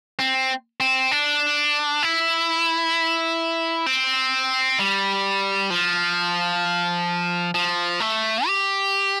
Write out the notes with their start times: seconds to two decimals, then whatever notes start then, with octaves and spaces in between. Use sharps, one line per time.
0.19 C4
0.80 C4
1.11 D4
2.03 E4
3.86 C4
4.79 G3
5.70 F3
7.54 F3
8.00 A3
8.46 G4